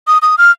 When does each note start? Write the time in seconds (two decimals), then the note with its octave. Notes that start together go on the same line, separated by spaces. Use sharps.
0.07 D#6
0.22 D#6
0.38 F6